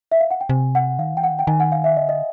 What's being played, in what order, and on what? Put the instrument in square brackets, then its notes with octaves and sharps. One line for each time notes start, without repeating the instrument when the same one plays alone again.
[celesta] E5
F5
F#5
G5
[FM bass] C3 [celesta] G#5
[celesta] F#5
[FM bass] D#3 [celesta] F5
[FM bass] E3 [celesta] G5
[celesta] F#5
[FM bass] D#3
[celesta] G5
[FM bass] D#3 [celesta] G#5
[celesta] F#5
F5
E5
[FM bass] D3 [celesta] D#5
[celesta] D#5